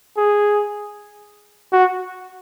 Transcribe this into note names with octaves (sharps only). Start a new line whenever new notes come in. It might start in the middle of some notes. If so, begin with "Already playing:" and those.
G#4
F#4